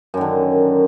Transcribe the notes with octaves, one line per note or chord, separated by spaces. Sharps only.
F#2 D3 D#3